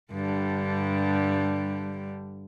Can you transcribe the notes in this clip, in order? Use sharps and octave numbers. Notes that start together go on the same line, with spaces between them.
G2 D3 G3